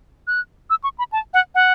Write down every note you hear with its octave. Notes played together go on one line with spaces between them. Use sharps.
F#6
E6
C#6
B5
A5
F#5
F#5